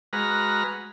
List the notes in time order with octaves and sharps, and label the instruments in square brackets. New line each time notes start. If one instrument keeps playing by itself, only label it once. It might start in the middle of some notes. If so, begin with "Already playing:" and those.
[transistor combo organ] G#3 F#4 B4 A#5 F6